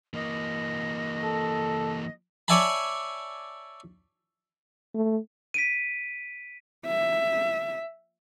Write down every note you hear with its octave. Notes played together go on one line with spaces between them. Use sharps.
E3 A#3 D#5
A4
C#5 D5 E5 G#5 A5 B5
A3
B6 D7 D#7
E5